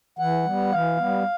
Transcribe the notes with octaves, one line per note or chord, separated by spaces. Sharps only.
E3 F#5
G3 B3
E3 F5
G3 B3